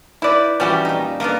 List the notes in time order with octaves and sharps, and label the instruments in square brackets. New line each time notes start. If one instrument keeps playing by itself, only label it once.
[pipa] E4 D5 [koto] B4 C5
[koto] E3 G3 C#4 [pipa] F3 F#4 G4
[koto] A#2 D#4
[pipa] D3 B3 [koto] A#3 A#4 D#5